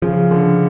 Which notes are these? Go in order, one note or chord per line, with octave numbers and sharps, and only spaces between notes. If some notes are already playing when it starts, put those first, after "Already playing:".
C#3 F3
D3